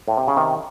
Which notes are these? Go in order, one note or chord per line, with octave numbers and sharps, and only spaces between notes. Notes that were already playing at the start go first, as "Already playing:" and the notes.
A2
C3
C#3
C3 D#3